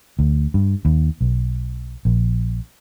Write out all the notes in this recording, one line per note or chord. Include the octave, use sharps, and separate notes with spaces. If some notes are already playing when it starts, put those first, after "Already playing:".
D2
G2
D#2
B1
A#1